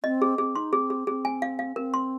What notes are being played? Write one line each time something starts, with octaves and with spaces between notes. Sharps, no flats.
C4 D#5
G#4
C4 G#4
D#4 C6
C4 G#4
G#4
C4 G#4
G#5
F5
F5
C4 A#4
C6